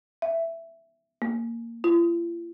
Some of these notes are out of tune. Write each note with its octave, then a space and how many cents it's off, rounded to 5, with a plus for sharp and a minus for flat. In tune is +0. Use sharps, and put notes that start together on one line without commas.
E5 +10
A#3 -10
F4 -45